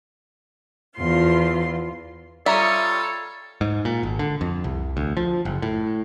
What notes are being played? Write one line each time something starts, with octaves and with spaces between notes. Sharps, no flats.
E2 F3 F4 C6
G3 F4 A4 C#5 E5 A#5 D#6
G#2
A#2
G#1
D3
F2
C2
D2
F3
F#1
A2